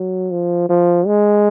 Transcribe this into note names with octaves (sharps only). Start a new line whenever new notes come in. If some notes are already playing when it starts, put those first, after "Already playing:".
Already playing: F#3
F3
F3
G#3